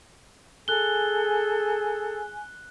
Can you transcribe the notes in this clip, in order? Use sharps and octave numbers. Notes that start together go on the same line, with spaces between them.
G#4 A4 G#5 F#6 G7